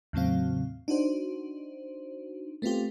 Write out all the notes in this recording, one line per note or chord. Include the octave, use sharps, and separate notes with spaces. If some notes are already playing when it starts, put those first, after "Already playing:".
E2 A2 C#3 F#3 C4 F5
D4 D#4 F#4 C5
A3 B3 C4 F4 G4